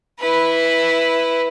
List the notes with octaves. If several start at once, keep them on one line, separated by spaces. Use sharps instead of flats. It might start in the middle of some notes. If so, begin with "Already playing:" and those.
E4 B4